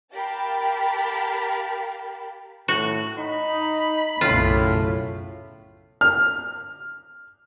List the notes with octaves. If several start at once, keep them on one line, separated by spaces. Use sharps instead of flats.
G4 A#4 F5 G5 A5 B5
A2 F#4
D#4 B5
B1 F#2 A2 C#3 F4
F6